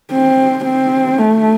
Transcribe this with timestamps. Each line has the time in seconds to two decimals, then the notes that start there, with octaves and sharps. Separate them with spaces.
0.12 C4
0.64 C4
1.18 A3